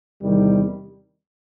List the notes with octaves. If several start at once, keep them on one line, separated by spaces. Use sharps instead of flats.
E2 C3 D#3 G3